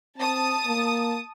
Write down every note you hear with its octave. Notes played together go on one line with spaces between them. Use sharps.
C4 A5 D#6
A#3